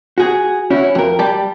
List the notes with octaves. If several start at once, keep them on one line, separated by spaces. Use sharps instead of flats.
F#4 G#4
C#4 E4 F#4
F2 A#4
G3 D5 A5